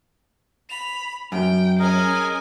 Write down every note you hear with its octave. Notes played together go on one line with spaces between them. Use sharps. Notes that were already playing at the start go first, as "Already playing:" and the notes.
B5 F7
F#2 G5
C#4 G#4 A#4 D#5 G#5